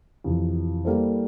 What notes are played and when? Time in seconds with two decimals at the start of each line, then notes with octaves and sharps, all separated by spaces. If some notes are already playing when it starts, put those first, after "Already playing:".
0.24 F2 C3 E3
0.85 G3 A#3 E4 A4 C5